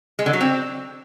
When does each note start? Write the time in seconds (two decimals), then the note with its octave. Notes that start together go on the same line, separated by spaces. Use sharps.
0.19 G#3
0.26 D3
0.33 F#3
0.41 C4